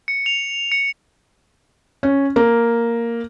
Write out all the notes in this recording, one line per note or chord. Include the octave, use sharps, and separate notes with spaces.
C#7
F7
C#7
C#4
A#3